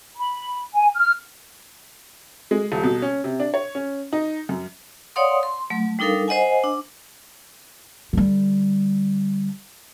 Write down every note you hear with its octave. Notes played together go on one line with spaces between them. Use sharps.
B5
G#5
F6
G#3
D#1
B2
C#4
C3
D4
C#5
C#4
D#4
F#2
C#5 D5 F5 F#5 C6 D#6
C6
F#3 A3
G3 D4 D#4 A4 A#4 F5
C5 D#5 F#5 G#5
D4
D3 G3